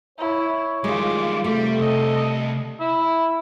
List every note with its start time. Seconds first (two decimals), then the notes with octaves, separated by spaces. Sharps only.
0.18 E4 C#5
0.84 D#3 G3 G#3 F4 G#4 D6
1.44 C3 G3 A3
1.79 C2 A4 D#5
2.80 E4